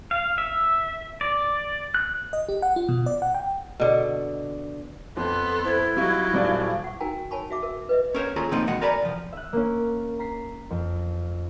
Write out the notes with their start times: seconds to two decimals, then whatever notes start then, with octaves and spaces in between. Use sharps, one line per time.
0.11 F5
0.38 E5
1.21 D5
1.94 F#6
2.33 D#5
2.49 G4
2.62 F#5
2.76 F4
2.89 B2
3.06 D5
3.22 F#5
3.35 G5
3.80 B2 D3
5.17 F2 B3 A4 C6
5.64 E4 C5
5.97 F#3 G3 D#4 F5
6.34 D#1 G3 D5
6.84 F#5 C#6
7.00 D#4 F#4 A#4 G5 G#5 A#5
7.31 A#4 C#5 G#5 A5 B5 C#6
7.51 F#4 E5 D6
7.63 A#4 E5
7.89 B4 D#5 E5
8.15 C#4 A#4 C5 C#5
8.36 D#2 A3 C#4 F4 G#4 A#5
8.51 B2 F3 A#3 C4 D#4 D#5
8.67 E2 B2 G#3 D#5 F#5
8.82 A#4 B4 D5 G#5 A#5 B5
9.02 C2 F3
9.33 E5 F#6
9.53 A#3 C#4
10.19 A#5 B6 C7
10.70 F2